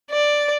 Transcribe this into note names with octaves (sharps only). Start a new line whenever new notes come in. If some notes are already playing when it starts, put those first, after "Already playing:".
D5